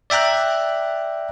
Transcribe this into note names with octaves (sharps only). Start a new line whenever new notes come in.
D5 E5 G5 A#5 F#6